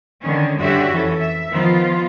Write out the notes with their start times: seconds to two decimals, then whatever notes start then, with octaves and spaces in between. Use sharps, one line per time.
0.22 D3 D#3 C#4
0.58 G2 D3 C#4 F#4 G4 E5
0.91 F2 E3 C#4 A4
1.21 E5
1.50 D#3 F3 B3 F4